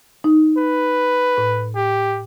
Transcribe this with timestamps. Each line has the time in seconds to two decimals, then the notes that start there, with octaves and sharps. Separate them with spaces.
0.24 D#4
0.58 B4
1.37 A2
1.76 G4